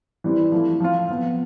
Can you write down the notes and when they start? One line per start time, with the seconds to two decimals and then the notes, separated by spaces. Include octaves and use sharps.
0.24 E3 G3 C4 E4
0.52 F3 A3 E4
0.80 F3 C4 F4
1.09 F3 B3 F4